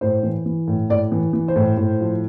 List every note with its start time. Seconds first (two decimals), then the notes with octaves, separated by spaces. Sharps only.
0.01 A2 C5
0.23 E3
0.46 E3
0.68 A2
0.90 A2 D5
1.12 E3
1.33 E3
1.48 C5
1.56 A2
1.77 A2
2.00 F3